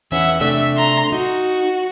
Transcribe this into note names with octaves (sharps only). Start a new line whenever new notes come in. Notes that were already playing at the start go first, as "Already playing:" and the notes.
E2 E3 C#4 E5 F#5
C3 A3 D4 E5
A#5 C6
D#4 F#4